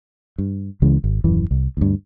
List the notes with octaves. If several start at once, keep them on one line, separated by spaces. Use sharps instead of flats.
G2
C#2 C#3 E3 G#3
G#1
D#1 F#2 E3
C2
D2 G2